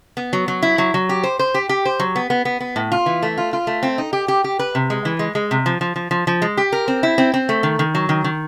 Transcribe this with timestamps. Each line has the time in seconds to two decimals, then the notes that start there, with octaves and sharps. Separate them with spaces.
0.17 B3
0.33 F#3
0.48 F#3
0.62 E4
0.78 F#3
0.94 F#3
1.09 G4
1.23 C5
1.39 C5
1.54 G4
1.69 G4
1.86 C5
2.00 F#3
2.16 B3
2.30 B3
2.45 B3
2.60 B3
2.76 A2
2.92 F4
3.06 E3
3.23 A3
3.38 F4
3.53 F4
3.67 A3
3.83 C4
3.98 D#4
4.13 G4
4.28 G4
4.44 G4
4.59 B4
4.75 C3
4.90 G#3
5.05 E3
5.19 G#3
5.35 G#3
5.51 C3
5.66 F3
5.81 F3
5.96 F3
6.11 F3
6.27 F3
6.42 G#3
6.57 G4
6.72 A#4
6.88 C4
7.03 E4
7.18 C4
7.34 C4
7.49 A3
7.63 D#3
7.79 D#3
7.95 F#3
8.09 D#3
8.24 D#3